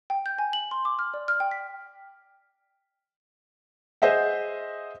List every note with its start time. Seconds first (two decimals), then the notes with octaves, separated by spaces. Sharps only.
0.10 G5
0.26 G6
0.39 G#5
0.53 F#7
0.71 C6
0.85 D6
0.99 F6
1.14 D5
1.28 F6
1.40 G5
1.51 B6
4.02 G#4 C5 D#5 E5 F#5